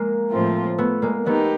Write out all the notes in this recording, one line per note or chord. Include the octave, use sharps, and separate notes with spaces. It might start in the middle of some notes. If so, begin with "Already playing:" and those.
Already playing: G#3 A#3
A2 F3 A3 C4 F4
A3 B3
G#3 A#3
A3 B3 D#4 G4